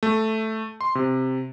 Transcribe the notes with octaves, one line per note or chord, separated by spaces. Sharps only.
A3
C6
C3